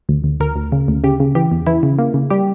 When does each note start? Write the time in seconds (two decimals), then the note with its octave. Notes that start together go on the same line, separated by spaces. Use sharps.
0.09 D2
0.24 D2
0.40 D2 A#4
0.56 D2
0.72 C#3
0.88 D2
1.04 C#3 G4
1.20 C#3
1.35 E3 G4
1.51 E2
1.67 E3 E4
1.83 C#3
1.99 A#3
2.14 C#3
2.30 G3 G4